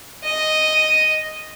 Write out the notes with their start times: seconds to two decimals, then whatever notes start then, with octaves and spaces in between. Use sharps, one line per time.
0.24 D#5